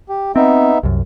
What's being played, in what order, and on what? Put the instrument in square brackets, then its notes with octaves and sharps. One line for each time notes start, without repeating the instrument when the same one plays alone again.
[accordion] G4
[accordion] B3 D#4 E5 [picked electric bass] C4
[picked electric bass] C2 F#2